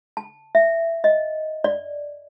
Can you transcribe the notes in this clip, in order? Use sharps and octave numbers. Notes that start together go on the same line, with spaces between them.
A5
E5
D#5
D5